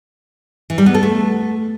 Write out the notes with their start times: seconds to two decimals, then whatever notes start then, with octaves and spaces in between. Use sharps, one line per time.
0.70 E3
0.78 G3
0.86 B3
0.94 A4
1.03 A3